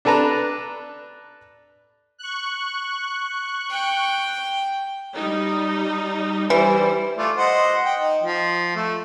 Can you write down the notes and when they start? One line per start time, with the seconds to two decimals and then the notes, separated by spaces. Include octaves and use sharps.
0.05 D4 A4 B4 A5 A#5
2.18 C#6 F#6
3.71 G5
5.15 G3 D#4
6.50 E3 G3 C5
7.17 A3 F4 D5
7.36 C5 D#5 F#5
7.86 G5
7.99 D#4
8.23 F3
8.76 A3